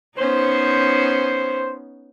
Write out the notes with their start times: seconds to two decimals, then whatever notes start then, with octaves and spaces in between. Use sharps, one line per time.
0.18 B3 C#4 D#4 C5